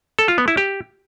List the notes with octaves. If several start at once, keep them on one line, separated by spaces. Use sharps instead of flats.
A4
F4
B3
E4
G4